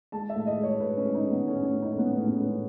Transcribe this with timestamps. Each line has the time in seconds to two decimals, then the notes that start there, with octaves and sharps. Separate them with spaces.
0.12 G#3 A5
0.29 E5
0.35 A2
0.47 D#5
0.57 G#3
0.63 C#5
0.80 A2 B4
0.97 C#4
1.03 G#3
1.15 D#4
1.25 G#3
1.31 B3
1.47 A2 C#4
1.65 C#4
1.70 A2
1.82 D#4
1.92 G#3 C#4
1.99 B3
2.16 A2 C#4
2.27 B3
2.38 G#3 C#4